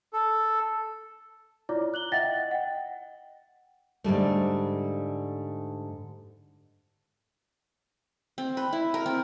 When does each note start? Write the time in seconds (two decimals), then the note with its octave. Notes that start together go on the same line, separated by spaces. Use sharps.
0.13 A4
1.69 E4 F4 C#5 D5 A#5 D6
1.94 F#6 F#7 G7
2.12 D#5 E5 F#5 G5 A6 A#6
2.34 D#5
2.51 F#5 G5
4.04 G#2 D3 G3 A3
8.38 C4
8.57 B4
8.73 E4
8.94 A#4
9.06 C4